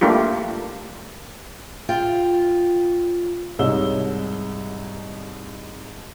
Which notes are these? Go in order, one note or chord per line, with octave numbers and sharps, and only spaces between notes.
A3 A#3 D4 F4 G4
F4 G5
C2 G#2 D#4 C#5 E6 G7